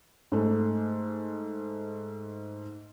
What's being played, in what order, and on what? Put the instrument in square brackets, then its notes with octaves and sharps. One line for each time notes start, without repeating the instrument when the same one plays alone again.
[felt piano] G#2 A3